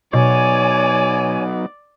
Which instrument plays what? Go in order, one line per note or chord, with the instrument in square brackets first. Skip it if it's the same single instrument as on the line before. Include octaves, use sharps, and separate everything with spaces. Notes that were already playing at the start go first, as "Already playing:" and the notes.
[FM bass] B2 [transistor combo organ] F#3 B3 D#4 [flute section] C#5 G#5 [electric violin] D5